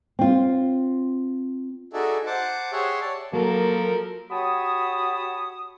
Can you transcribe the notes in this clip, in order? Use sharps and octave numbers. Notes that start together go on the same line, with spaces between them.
C4 F4
D#4 F#4 G#4 A4 D5 E5
C5 F#5 A5 D6
G4 G#4 C#5 E5 F#5 C6
C#5 D5 A5
F3 F#3 A#3 A4 A#4
F#4 G4 C#5 A5 B5 D#6